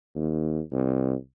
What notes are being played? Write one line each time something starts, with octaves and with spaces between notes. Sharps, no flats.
D#2
C2